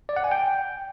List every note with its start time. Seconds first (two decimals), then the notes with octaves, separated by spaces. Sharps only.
0.09 D5
0.16 F#5
0.24 G#5
0.31 G5